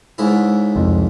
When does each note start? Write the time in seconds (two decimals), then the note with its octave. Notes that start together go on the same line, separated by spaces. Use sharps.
0.18 C#2 G#2 E4
0.76 C2 F2